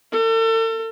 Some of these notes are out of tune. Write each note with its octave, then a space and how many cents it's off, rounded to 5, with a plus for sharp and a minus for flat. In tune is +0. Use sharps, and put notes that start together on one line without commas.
A4 +40